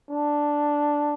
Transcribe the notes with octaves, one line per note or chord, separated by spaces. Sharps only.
D4